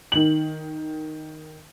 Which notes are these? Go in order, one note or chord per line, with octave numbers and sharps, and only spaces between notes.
D#3 F#7